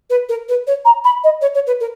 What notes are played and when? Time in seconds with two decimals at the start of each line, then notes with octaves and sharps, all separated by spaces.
0.10 B4
0.29 A#4
0.49 B4
0.67 C#5
0.85 A#5
1.04 B5
1.24 D#5
1.41 C#5
1.54 C#5
1.67 B4
1.80 A#4